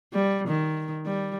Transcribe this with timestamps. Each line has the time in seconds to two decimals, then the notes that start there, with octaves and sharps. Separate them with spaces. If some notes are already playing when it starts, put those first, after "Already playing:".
0.13 G3
0.48 D#3
1.06 G3